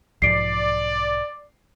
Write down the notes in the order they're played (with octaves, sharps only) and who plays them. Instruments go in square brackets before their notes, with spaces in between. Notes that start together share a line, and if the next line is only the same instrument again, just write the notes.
[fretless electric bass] B1 G#2 F3 [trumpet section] D5 [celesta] C7 D7